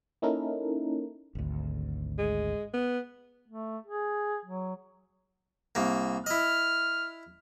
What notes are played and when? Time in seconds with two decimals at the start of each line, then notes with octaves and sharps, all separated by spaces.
0.22 A#3 C#4 D#4 E4 A4 A#4
1.35 G#1 D2
2.18 G#3
2.73 B3
3.48 A3
3.86 G#4
4.45 F#3
5.75 C2 A#3
6.26 E4 D#5 F6